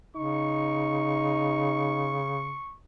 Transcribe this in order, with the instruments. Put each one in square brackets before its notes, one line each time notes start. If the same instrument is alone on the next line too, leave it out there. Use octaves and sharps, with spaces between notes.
[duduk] C#3 [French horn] D#4 [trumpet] C#6